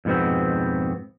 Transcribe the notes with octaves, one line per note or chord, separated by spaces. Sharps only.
F2 G#2 B2 B3 C4